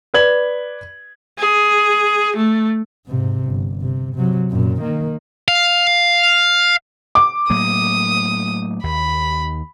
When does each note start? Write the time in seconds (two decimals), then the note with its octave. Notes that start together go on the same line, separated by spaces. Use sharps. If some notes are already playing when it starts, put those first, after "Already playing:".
0.14 B4 D5 G#6 F#7
1.38 G#4
2.36 A3
3.07 G#2 C3
3.46 G1
3.81 C3
4.15 C3 F#3
4.50 F#2 A#2
4.81 D#3 A#3
5.48 F5
7.15 D6
7.50 A2 F#3 A#3 D#6
8.83 D#2 B5